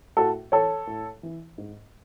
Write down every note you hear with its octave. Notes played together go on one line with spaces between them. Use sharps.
A2 F#4 A4
E3 A4 C#5
A2
E3
G#2